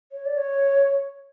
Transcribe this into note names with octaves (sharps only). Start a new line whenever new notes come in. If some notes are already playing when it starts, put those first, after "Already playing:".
C#5
D5
C#5